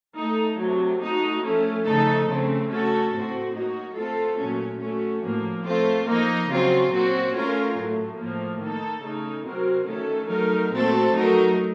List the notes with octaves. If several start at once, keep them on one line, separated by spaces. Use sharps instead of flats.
A3 D#4 A4
C3 F#3 A3
A3 D#4 F#4
F3 A3 C#4
C#3 F3 A3 D#4 A4
C#3 A3 C4
A3 C#4 F#4 A4
A2 A3 C4 F#4
F#3 A#3 D#4 F#4
A3 C4 F4 A4
A#2 F#3 A3 C#4
A3 C#4 F#4
A2 F3 A#3
A3 C4 F4
F3 A#3 D#4
C#3 F#3 C4 F4
A#2 F#3 C4 F#4
A3 C#4 F4 A#4
A2 F#3 A3
A2 F3 A#3
D#3 A#3 D#4 A4
C#3 A3 D#4
C3 F#3 C4 F#4 A#4
D#3 A3 C#4 A4
F#3 A3 D#4 A#4
A#2 A3 C4 F#4 A4
F#3 A3 D#4 F#4 A#4